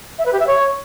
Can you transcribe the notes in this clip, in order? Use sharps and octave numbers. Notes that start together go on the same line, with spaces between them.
E5
B4
G4
E5
C#5